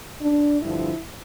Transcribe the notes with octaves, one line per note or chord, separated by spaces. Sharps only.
D4
G2 D3 F3 E4